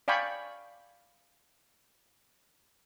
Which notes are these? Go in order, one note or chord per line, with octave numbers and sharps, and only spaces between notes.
D5 F5 G5 G#5 B5 C#6